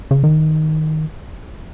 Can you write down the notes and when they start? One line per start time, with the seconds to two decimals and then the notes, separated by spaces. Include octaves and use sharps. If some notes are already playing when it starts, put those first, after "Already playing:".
0.11 C#3
0.23 D#3